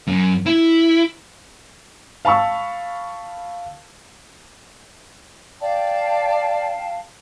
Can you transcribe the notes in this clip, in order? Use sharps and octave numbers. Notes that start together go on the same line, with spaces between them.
F#2
E4
F5 A5 B5 C#6 E6
D5 F5 G5 A5